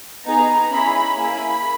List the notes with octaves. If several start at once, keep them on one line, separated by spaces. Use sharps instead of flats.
B3 D#4 G#4 A#5
C#4 E4 G#4 B5
A#3 E4 G#4 B5